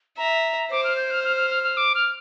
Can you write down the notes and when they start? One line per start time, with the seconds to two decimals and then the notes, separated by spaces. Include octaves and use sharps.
0.18 E5 A#5
0.71 C5 D6
0.84 F6
0.97 G6
1.11 F6
1.24 F6
1.36 F6
1.50 F6
1.63 F6
1.77 D6
1.95 F6